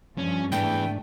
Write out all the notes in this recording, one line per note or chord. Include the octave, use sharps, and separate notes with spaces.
G2 F3 C#4
G#2 E3 A3 B3 D4 G5